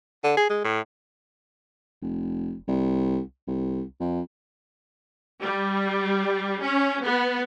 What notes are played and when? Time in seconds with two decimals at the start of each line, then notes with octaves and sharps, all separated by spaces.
0.24 D3
0.37 G#4
0.50 G#3
0.64 A2
2.01 F1
2.68 C2
3.47 C2
4.00 F2
5.41 G3
6.60 C#4
7.02 B3